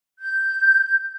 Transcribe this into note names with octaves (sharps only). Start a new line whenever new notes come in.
G6